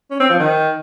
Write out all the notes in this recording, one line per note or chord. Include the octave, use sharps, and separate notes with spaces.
C#4
C4
F3
D#3